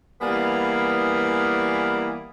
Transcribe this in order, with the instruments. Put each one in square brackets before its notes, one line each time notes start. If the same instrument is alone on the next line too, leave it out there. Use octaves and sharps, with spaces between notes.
[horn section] E3 G3 A#3 B3 F5 G#5